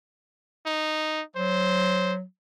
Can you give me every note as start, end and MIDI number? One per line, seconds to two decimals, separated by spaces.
0.66 1.22 63
1.36 2.23 54
1.36 2.14 72